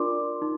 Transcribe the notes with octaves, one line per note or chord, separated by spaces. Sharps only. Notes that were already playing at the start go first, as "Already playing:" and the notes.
Already playing: D4 F4 A#4 D5 C6 D6
D#4